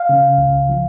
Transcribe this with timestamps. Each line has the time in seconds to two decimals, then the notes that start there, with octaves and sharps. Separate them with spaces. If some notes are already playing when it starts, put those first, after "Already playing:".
Already playing: F5
0.09 C#3
0.38 C#2
0.69 F3